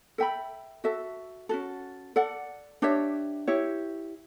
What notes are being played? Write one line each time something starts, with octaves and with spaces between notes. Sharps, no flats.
A4 E5 G5 B5
F#4 A4 E5
C#4 F#4 A4
A4 D5 F#5
D4 G4 C#5 E5
E4 G4 C#5